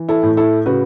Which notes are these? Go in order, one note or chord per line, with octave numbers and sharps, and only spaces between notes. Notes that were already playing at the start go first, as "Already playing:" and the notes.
Already playing: E3
E4 A4
A2
E4 A4
C#3 F#4 B4